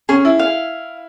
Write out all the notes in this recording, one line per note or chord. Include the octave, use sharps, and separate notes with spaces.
C#4 G#4
E4
F5